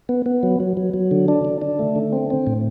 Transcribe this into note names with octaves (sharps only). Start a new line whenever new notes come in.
B3
B3
F#3
F#3
F#3
F#3
D3
D4
D3
D4
A3
D3
C4
C4
A2